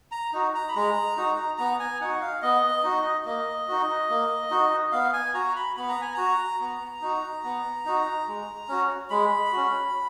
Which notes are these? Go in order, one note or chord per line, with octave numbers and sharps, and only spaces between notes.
A#5
D#4 F#4
A#5
B5
G#3 A#5
D#4 F#4
B3 A#5
G#5
D#4 F#4 F#5
F5
B3 D#5
D#4 F#4
A#3 D#5
D#4 F#4
A#3
D#4 F#4
B3 F5
G#5
F#4 A#5
B5
B3 B5
A#5
G#5
F#4 A#5
B3
D#4 F#4
B3
D#4 F#4
G#3
C#4 F#4
G#3 B5
C#4 F#4